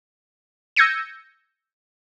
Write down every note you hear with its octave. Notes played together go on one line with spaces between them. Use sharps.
E6 G6 G#6 A#6 C#7 D#7